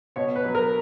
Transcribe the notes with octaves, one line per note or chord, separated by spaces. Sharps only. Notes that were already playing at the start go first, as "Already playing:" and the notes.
B2 C#5
B4
F#3
A#4